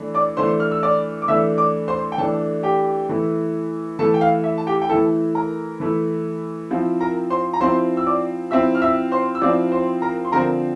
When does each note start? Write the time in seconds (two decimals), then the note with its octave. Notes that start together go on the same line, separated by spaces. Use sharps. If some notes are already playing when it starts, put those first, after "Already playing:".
Already playing: E3 A3 D4
0.14 D5 D6
0.37 E3 A3 D4 C5 C6
0.60 F6
0.72 E6
0.83 D5 D6
1.22 D6
1.28 E3 A3 D4 E5 E6
1.58 D5 D6
1.88 C5 C6
2.12 G5
2.18 E3 A3 D4 A4 A5
2.63 G4 G5
3.09 E3 A3 E4
3.99 E3 A3 E4 A4 A5
4.14 G5
4.21 F5
4.44 E5
4.58 A5
4.67 G4 G5
4.82 G5
4.89 E3 A3 E4 A4 A5
5.35 A#4 A#5
5.80 E3 A3 E4
6.70 F3 C4 E4
7.00 A#4 A#5
7.30 C5 C6
7.53 A#5
7.61 F3 C4 E4 C5 C6
7.97 E6
8.07 D5 D6
8.51 F3 C4 E4 E5 E6
8.75 F6
8.82 E5 E6
9.12 C5 C6
9.35 E6
9.41 F3 C4 E4 D5 D6
9.72 C5 C6
10.02 A#4 A#5
10.25 C6
10.32 D3 F3 C4 A#4 A#5